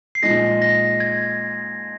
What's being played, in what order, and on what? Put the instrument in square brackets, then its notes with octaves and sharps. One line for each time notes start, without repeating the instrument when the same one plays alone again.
[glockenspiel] C7
[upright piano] A#2 F3 G#3 D#4 G#4 [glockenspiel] A#6
[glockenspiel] A#6
G#6